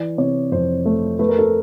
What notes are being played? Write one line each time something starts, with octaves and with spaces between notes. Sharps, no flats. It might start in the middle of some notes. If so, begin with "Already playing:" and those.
Already playing: E3 D5
C3 C#5
F2 C5
A3
A3 B4
A#4
A4